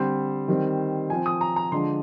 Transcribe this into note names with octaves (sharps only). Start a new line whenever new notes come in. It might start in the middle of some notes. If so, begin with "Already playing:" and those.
Already playing: D3 G3 C4 C5
D#3 G3 C4
F3 C4 G#5
D#6
A#5
A#5
D3 F3 G#3 D4 C6